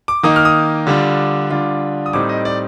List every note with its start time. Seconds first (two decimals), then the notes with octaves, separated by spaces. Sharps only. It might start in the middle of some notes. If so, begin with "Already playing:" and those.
0.08 D6
0.23 D#3 A#3 D#4 D#6
0.36 F6
0.45 D#6
0.87 D3 G3 D4 F4
1.50 D3 G3 D4 F4
2.06 D#6
2.13 A2 G3 C4 D#4 D6
2.29 D#5
2.45 D5